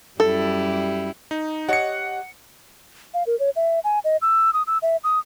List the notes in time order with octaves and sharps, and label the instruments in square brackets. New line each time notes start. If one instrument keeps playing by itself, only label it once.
[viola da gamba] F#2 G3 E4 [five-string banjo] A4
[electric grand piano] D#4
[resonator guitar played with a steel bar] G4 C#5 D#5 [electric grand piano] F#5 C#7
[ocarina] F5
A#4
C#5
E5
G#5
D#5
E6
D#6
E6
E5
D#6